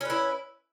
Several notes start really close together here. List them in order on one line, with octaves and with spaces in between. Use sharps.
C#4 B4 E4